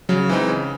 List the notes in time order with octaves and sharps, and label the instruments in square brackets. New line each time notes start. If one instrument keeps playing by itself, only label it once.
[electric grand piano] C#3 [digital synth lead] F#3
[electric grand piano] E3 G#3 C4 D#4
C#3